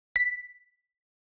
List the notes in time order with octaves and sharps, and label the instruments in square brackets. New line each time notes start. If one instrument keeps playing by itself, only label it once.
[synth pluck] B6